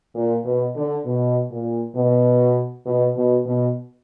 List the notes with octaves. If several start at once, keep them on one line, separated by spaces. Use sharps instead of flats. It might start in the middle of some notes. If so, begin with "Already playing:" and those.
A#2
B2
D3
B2
A#2
B2
B2
B2
B2